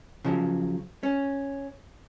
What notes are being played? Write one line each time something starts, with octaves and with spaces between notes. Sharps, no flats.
C#3 F3 F#3
C#4